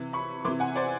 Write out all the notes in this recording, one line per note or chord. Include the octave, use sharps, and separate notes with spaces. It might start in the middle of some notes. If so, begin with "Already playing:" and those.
Already playing: C3 E3
B5 C#6
C3 E3 C6 D6
F#5 G#5
C5 D5